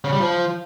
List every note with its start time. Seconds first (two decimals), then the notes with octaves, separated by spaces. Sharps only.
0.04 C#3
0.12 G3
0.20 F3